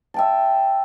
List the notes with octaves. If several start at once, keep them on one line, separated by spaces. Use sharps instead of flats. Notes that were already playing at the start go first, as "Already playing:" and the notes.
E5 G5 A5